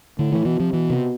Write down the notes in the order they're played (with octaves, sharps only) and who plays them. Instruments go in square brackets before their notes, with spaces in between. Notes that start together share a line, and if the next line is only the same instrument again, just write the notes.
[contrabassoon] A2 [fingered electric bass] D3
[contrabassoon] A2 [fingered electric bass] E3
[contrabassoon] B2 [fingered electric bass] E3
[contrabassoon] C3 [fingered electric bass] F3
[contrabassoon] B2 [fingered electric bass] E3
[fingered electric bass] C3